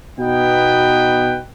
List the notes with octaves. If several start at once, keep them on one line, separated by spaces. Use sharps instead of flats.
B2 B3 D#4 B4 G5